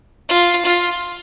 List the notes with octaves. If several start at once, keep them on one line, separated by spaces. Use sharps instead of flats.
F4
F4